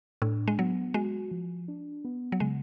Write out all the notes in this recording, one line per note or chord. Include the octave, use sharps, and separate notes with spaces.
A2 D4
G#3
F#3 B3
G#3 F#4
F3
D4
B3
F#3
C#3 G#3